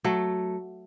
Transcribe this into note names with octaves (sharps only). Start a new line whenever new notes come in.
F#3 A3